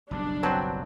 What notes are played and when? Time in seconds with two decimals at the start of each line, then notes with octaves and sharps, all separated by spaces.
0.11 F#1 B1 G3 D4
0.43 F#3 C4 B4 G5 A5